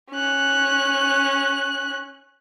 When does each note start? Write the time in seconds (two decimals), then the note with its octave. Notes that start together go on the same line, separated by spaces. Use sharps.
0.11 C#4 F#6